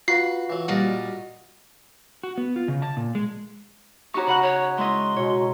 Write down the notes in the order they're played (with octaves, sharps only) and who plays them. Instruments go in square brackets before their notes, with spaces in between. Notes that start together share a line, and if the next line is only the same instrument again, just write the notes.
[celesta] F4 F5 [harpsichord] F#4 B4 [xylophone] C7
[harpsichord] E3 F#3
[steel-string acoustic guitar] A#2 G3 [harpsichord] F#4 A#4 D#5
[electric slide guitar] F#4
B3
F4
C#3
A5
A#2
G#3
[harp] D#4 F#4 C#5 [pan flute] G4 [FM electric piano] A#5 C#6
[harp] C#3 F#5 F#6 [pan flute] B5
[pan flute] C#5
[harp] G#3 E4 D#5 [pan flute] C6
[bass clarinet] B2 [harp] C#5